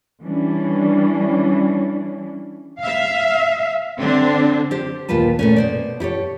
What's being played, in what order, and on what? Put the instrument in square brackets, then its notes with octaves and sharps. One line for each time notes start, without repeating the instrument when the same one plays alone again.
[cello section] E3 G3 C#4 D4
E5 F5
D3 C4 D4
[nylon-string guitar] G4 C5
D#2 A#2 F4 B4 A5
A#2 A3 C#4
B2 C5 D5
E4 G4 A4 C#5